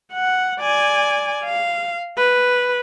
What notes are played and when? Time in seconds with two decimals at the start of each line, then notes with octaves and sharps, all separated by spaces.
0.13 F#5
0.60 D5 G#5
1.45 F5
2.17 B4